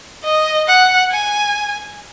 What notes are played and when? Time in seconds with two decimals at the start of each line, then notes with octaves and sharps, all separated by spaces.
0.25 D#5
0.68 F#5
1.11 G#5